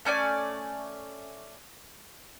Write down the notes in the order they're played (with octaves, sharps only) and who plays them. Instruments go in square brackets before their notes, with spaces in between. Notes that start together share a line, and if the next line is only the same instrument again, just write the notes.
[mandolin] A3 C#4 D5 G#5